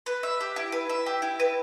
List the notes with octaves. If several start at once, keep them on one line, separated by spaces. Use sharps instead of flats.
B4
E5
G4
E4
B4
E5
G4
E4
B4